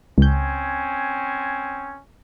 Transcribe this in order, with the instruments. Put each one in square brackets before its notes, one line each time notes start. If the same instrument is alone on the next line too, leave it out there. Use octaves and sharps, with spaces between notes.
[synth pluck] C#2 G6 [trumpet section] C4 C#4 G#5